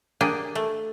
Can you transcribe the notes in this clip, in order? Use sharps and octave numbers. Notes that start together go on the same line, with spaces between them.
A#3 D4 G4 G#4
A3